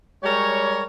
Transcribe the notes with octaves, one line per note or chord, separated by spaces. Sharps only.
G3 G#3 G4 A#4 C#5